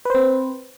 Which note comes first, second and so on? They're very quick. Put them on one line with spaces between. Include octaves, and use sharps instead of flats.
B4 C5 C4